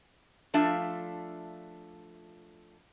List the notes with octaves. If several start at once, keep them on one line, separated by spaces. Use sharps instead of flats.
F3 A3 D4 F4 E5